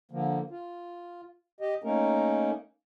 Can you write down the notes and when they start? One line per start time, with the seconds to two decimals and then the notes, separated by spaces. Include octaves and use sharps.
0.11 D3 F3 A#3
0.50 F4
1.60 G4 D#5
1.84 A3 A#3 C#4 D#4 A#4